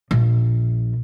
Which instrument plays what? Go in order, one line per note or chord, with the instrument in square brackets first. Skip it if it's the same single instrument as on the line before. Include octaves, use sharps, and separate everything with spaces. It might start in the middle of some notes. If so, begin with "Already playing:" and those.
[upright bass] A#1